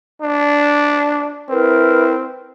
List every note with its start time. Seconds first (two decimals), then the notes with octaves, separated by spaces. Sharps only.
0.22 D4
1.50 C4 E4 A#4 B4